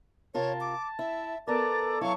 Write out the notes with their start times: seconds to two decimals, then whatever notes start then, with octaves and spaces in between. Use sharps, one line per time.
0.34 C3 F4 A#4 C#5 A5
0.61 D6
0.99 E4 E5
1.47 B3 A4 A#4 D5 A5 A#5
2.01 F#3 E4 A4 F5 C#6